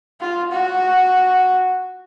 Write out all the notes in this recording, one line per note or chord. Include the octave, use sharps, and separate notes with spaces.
F4
F#4